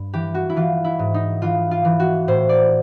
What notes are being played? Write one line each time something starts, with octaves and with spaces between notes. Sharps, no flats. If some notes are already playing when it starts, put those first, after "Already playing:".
Already playing: G2
E3 G4
F#4
E4
E3 F4
E4
G#2
D#4
E3 F4
F4
E3
F#4
A2 C5
D5